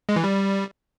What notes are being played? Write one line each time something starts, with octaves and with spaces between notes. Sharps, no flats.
G#3
E3
G3